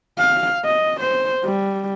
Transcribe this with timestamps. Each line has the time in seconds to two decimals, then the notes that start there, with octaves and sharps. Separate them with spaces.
0.18 F5
0.65 D#5
1.01 C5
1.44 G3